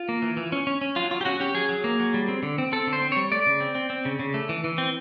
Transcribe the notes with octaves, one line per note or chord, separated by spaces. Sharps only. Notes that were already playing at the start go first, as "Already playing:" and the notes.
Already playing: F4
A#3
E3
E3
C#4
C#4
C#4
F#3 F4
F#3 F4
G4
C#4 F#4
C#4 G4
F#3 G#4
F#3
A#3
F#3
G3
C4
D3
C4
C4 A4
D3
C5
C4
G3 C#5
A3 D5
C#3
C4
C4
C4
C#3
C#3
A3
E3
E3
C4